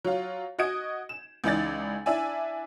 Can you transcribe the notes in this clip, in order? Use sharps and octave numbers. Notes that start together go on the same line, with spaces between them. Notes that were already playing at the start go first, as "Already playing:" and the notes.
F#3 F4
F#4 D#5 G#6 D7
E7
C#2 E3 D#4 D5 A6
D4 E4 D5 E5 G#5